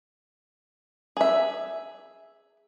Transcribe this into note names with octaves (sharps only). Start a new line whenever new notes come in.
G#4 E5